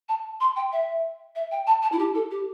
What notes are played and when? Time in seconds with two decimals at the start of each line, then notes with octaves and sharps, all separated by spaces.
0.09 A5
0.41 C6
0.56 G5
0.72 E5
1.36 E5
1.52 G5
1.67 A5
1.83 A5
1.92 E4
1.99 G4
2.15 A4
2.31 G4